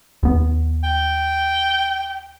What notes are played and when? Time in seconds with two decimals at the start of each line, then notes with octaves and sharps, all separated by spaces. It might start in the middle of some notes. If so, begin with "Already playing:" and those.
0.23 D#2 B3
0.84 G5